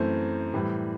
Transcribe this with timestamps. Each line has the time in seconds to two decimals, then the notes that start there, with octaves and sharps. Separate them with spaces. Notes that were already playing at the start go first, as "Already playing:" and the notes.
Already playing: F#2 E3 A3 C4 C5
0.54 A2 E3 G3